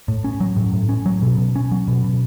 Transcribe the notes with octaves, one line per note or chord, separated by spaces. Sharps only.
A2
C#4
F#3
A2
A2
C#4
F#3
B2
B2
C#4
F#3
B2
B2